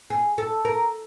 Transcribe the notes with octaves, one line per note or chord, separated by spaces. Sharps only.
G#4
A4
A#4